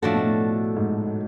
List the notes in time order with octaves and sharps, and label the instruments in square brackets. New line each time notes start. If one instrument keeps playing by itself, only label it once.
[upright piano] A2 [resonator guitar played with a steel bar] F3 A3 D4 F#4 A4
[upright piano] B2
A2
G#2